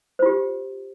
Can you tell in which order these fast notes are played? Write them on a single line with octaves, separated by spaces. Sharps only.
C5 F4 G4